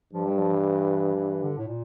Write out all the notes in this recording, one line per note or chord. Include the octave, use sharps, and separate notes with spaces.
G2 F3
G3
F3
E3
E3
D3
A2
A#2